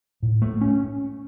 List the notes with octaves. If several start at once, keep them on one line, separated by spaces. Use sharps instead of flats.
A2
A3
C#4